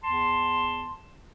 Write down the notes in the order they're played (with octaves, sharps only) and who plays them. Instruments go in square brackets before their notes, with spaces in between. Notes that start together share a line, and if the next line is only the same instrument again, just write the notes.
[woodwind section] E2 A5 C6